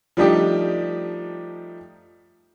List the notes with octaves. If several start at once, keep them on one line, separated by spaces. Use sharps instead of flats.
F3 G3 A3 D4 D#4 G4